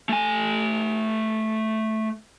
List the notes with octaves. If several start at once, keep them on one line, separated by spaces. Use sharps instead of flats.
A3 G#5